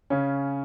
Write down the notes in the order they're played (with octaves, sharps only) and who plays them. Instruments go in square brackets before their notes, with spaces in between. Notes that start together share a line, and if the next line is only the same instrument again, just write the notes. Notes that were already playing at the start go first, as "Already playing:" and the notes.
[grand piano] C#3 C#4